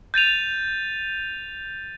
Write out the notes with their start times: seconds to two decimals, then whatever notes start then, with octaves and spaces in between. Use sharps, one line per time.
0.14 G6 A6 D#7 F7